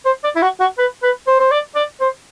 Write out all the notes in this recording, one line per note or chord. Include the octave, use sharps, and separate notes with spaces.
C5
D5
E4
F#4
F#4
B4
B4
C5
C5
D5
D5
C5